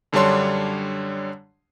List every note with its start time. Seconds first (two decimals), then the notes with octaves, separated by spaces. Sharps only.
0.13 F#2 D3 G3 D4 C#5 C6